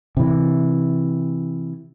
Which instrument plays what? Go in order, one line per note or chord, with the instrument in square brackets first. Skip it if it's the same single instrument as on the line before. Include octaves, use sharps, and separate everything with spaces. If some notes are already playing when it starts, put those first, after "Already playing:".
[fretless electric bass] C3 E3